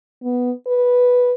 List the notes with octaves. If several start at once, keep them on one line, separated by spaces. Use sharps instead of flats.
B3
B4